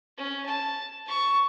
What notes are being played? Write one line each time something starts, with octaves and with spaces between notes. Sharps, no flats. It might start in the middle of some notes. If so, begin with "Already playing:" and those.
C#4
A5
A5 C#6